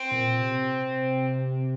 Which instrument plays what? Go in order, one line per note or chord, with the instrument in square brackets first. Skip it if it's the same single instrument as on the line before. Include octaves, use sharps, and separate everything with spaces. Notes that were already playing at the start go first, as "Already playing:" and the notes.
Already playing: [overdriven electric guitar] C4
[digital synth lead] A#2
C3